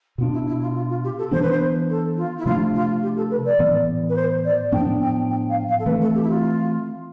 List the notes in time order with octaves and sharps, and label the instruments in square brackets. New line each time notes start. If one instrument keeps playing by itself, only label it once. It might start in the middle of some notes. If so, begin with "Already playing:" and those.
[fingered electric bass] B2 B3 D4 [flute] F4
[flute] E4
E4
F4
F4
F4
G4
A4
[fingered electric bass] E3 B3 D4 [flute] C5
[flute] B4
C5
A4
F4
E4
[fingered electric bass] C3 F3 A3 D4 [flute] F4
[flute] F4
G4
A4
B4
D5
[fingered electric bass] A2 E3 B3
[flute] B4
C5
D5
[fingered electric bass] A2 F3 B3 D4 [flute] G5
[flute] G5
G5
F5
F5
A4
[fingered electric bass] E3 A3 C4 [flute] B4
[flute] A4
G4
E4
F4